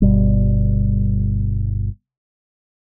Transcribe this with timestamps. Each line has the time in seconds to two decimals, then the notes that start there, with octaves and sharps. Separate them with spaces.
0.02 G1 B2 G3